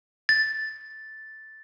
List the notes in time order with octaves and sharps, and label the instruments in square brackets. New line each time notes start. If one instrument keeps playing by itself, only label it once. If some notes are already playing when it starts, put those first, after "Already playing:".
[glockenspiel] A6